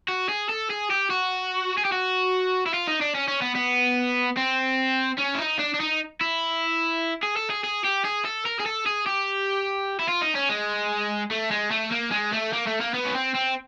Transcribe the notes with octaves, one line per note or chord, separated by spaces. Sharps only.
F#4
G#4
A4
G#4
G4
F#4
G#4
G4
F#4
E4
F4
D#4
D4
C#4
C#4
B3
B3
C4
C#4
E4
D#4
D4
D4
D#4
E4
G#4
A4
G#4
G#4
G4
G#4
A4
A#4
G#4
A4
G#4
G4
E4
F4
D#4
C#4
G#3
A3
G#3
A3
A#3
G#3
A3
A#3
A3
A#3
B3
C#4
C4
C4